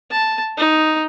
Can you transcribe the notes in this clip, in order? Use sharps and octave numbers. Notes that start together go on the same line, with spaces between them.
A5
D#4